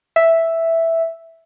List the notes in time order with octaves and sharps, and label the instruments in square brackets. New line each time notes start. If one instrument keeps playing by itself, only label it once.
[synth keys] E5